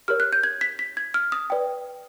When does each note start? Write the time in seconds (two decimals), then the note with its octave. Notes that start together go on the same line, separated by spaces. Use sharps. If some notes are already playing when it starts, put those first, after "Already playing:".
0.08 G4 A#4 C#5 F6
0.20 F#6
0.33 G6
0.44 G#6
0.61 B6
0.79 B6
0.97 G#6
1.14 F6
1.32 D#6
1.50 B4 D5 G5